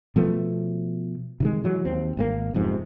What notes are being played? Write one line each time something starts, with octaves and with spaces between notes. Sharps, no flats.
B2 F3 A3 B3
C3 D#3 G#3
E3 F#3 G#3
D#2 C4
G#1 B2 A#3
E1 F2 G#2 C3